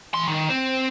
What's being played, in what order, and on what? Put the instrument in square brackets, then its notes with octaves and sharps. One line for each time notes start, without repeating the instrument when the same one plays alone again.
[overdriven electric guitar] E3 C6
D#3
C4 C5